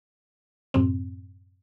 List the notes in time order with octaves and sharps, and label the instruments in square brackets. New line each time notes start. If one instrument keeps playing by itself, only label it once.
[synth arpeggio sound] F#2 A2 C3 C4